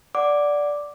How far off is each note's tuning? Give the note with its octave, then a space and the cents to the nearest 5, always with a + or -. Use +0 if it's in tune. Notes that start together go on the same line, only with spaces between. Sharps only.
D5 -5 F#5 +0 D6 +0